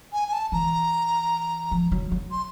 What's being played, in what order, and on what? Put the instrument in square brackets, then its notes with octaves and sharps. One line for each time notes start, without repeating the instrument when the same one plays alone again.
[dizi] G#5
G#5
A5
[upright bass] E3 [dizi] A#5
[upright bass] F3
F#3
F#3
[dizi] C6